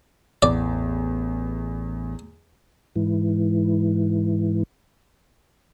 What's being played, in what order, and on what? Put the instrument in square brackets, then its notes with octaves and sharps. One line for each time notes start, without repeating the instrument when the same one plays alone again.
[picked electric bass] A1 [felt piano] E2 [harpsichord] D5
[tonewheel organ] G#2 E3